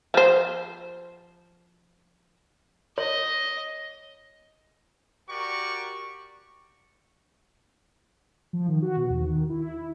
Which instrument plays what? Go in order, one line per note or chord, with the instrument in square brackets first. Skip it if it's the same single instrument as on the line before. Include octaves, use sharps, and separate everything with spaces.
[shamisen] F3 C5
[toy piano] C#5 [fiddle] D#5
[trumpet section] F#4 G4 A#4 D5 C#6
[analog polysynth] F3
D#3
F#4
B2
D#2
D#3
E4